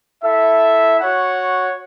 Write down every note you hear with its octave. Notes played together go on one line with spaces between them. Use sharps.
E4 A4 E5
F#4 C#5 F#5